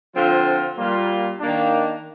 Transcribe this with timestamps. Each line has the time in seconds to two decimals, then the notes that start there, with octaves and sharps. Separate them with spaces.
0.14 D3 F3 C4 F4
0.77 A#2 G3 A#3 F4
1.40 D#3 A#3 D4